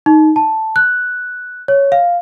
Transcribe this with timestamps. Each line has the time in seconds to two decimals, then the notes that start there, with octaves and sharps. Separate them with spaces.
0.06 D#4
0.36 A5
0.76 F#6
1.68 C#5
1.92 F5